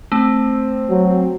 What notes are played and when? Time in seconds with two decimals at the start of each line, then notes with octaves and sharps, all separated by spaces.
0.12 A3 C4
0.90 F#3